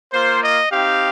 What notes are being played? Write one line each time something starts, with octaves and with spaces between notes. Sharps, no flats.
A#3 F4 C5
D#5
C4 D#4 G4 F5